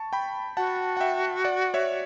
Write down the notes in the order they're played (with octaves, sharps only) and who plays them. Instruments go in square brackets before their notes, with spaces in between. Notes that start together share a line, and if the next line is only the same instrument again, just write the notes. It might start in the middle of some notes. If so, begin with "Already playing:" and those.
Already playing: [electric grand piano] A5 C#6
G5 B5
[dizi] F#4 [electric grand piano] F#5 A5
[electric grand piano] F#5
E5 G5
D5 F#5
C#5 E5